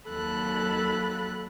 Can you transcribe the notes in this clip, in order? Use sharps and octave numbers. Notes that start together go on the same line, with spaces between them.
D#2 F#3 A4 B5 F#6